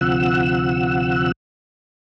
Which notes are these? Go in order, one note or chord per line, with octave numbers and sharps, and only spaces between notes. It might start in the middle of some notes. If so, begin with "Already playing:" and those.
D2 C3 F3 F#5 E6